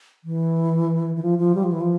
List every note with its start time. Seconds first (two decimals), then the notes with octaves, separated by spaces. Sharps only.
0.24 E3
1.16 E3
1.23 F3
1.39 F3
1.55 G3
1.64 F3
1.72 E3
1.81 F3